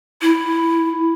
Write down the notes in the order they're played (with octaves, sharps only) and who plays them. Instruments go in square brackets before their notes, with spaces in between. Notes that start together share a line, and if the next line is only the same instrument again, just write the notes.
[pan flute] E4